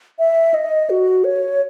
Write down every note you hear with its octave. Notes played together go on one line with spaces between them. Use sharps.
E5
D#5
F#4
C#5